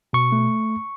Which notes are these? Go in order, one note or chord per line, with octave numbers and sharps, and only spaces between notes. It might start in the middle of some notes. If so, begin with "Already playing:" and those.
B2 C#6
A3